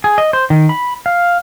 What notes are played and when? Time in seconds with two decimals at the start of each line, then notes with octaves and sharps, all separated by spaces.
0.04 G#4
0.18 D#5
0.33 C5
0.50 D#3
0.69 B5
1.06 F5